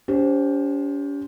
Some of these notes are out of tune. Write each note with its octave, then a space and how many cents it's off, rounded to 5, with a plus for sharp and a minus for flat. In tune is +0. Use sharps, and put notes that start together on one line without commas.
C#4 +45 G4 +0 C5 +0